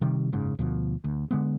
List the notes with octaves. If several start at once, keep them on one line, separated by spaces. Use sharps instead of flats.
C3 D#3 G3
F#1 G#2 C#3
D2 B2 F3
D2
D3 G#3 B3